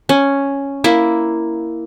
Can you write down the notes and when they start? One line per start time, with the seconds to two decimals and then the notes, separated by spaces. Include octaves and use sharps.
0.09 C#4
0.84 A#3 E4